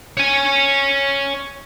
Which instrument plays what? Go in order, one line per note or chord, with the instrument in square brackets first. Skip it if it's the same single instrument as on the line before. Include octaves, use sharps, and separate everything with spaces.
[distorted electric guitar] C#5 G#5